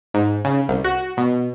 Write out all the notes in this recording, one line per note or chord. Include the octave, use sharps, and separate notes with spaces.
G#2
C#3
C2
F#4
B2